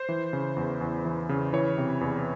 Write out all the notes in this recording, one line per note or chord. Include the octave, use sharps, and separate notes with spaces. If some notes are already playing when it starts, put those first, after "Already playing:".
Already playing: C5
E3
C#3
E2
E2
E3
C#3
E3 C#5
C3
E2